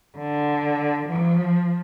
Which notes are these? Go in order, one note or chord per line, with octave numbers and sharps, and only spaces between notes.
D3
F3